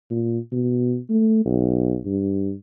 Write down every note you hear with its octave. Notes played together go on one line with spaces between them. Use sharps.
A#2
B2
A3
B1
G2